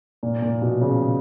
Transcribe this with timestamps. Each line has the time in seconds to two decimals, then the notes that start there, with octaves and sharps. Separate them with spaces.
0.23 A#2
0.42 A#2
0.62 B2
0.81 C#3